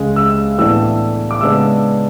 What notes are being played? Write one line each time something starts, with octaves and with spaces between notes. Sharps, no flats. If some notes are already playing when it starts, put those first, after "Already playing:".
Already playing: C#2 C#3 G#3
E6
A2 E3 B3 D4 E6
D6
C#3 G#3 B3 D4 E6